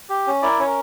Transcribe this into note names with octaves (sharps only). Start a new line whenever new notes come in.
G4
C#4
E4 A#4 D5
C#4 C#5
A#4